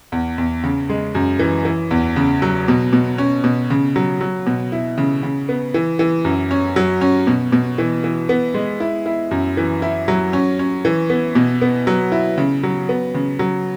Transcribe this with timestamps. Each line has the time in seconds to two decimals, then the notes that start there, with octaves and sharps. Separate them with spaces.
0.12 E2
0.38 E2
0.64 C#3
0.90 G#3
1.15 F#2
1.39 E3
1.65 E3
1.91 E2
2.16 C#3
2.42 F#3
2.68 B2
2.93 B2
3.18 C#4
3.44 B2
3.70 C#3
3.96 F#3
4.21 F#3
4.46 B2
4.72 E4
4.98 C#3
5.23 C#3
5.49 B3
5.74 E3
5.99 E3
6.25 F#2
6.51 C#4
6.76 F#3
7.01 C#4
7.27 B2
7.52 B2
7.78 E3
8.04 E3
8.29 B3
8.54 G#3
8.80 E4
9.06 E4
9.31 F#2
9.57 E3
9.82 E4
10.08 F#3
10.33 C#4
10.59 C#4
10.85 E3
11.10 B3
11.35 B2
11.62 B3
11.87 F#3
12.12 E4
12.38 C#3
12.63 F#3
12.89 B3
13.14 C#3
13.39 F#3